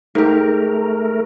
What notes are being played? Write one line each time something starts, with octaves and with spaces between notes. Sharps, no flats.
G#2 A3 G4 A#4